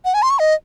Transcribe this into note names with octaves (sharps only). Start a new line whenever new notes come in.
F#5
G#5
C6
C#6
D#5